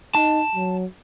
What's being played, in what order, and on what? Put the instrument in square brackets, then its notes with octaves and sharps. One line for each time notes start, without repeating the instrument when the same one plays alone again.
[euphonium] D#4 [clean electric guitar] A5
[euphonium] F#3